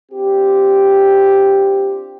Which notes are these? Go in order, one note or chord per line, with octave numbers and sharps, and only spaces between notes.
C4 D4 F4 G4